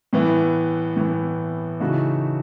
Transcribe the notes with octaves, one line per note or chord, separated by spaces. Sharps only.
A2 E3 B3
A2 E3 B3
C#3 E3 A3 D#4 F#4